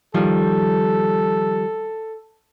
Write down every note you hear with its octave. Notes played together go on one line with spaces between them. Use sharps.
D#3 F3 G3 A4